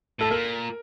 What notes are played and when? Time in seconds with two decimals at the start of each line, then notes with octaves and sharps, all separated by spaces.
0.19 A2 A4
0.30 A#2 A#4